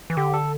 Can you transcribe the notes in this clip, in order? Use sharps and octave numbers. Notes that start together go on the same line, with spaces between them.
E3
D3 G4
A4